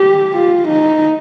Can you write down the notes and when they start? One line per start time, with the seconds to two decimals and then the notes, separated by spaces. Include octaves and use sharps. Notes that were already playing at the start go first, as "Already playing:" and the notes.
Already playing: G4
0.35 F4
0.68 D#4